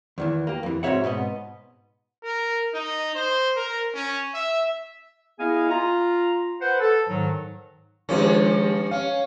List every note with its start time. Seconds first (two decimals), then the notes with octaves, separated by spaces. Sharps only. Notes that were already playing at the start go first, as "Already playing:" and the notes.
0.18 E2 D#3 E3
0.47 A#3 G4
0.63 F2 E3
0.83 G#2 C4 F#4 C#5 E5 F#5
1.04 G#2 B2 B3 D#5
2.24 A#4
2.74 D#4
3.15 C5
3.56 A#4
3.95 C#4
4.34 E5
5.39 B3 E4 G#4 D#5 F5 G#5
5.70 F4 A#5
6.61 B4 C5 F#5
6.80 A4
7.08 G#2 D#3 F#3
8.09 G2 D#3 F3 G#3 C#4
8.91 C#4 F5